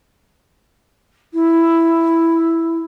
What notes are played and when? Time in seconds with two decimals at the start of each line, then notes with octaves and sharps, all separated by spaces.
1.34 E4